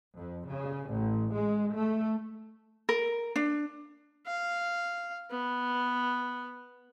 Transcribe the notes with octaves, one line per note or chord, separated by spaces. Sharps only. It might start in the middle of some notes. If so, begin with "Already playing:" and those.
F2
C#3
A1
G#3
A3
A#4
D4
F5
B3